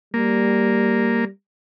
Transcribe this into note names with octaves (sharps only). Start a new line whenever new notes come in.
G3 A#3